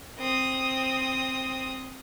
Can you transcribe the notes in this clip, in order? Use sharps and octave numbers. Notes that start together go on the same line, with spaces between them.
C4 D#6